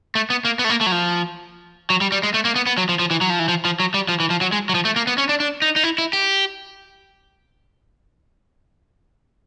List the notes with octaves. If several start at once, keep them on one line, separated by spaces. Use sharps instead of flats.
A3
B3
A#3
B3
A3
A#3
A3
F#3
F3
F#3
G3
G3
G#3
A3
A#3
B3
B3
F#3
F3
F3
E3
F#3
F3
E3
F3
F3
F#3
G3
F3
E3
F3
F#3
G#3
F#3
F3
A3
A#3
B3
C#4
D4
D4
D#4
D#4
E4
E4
G4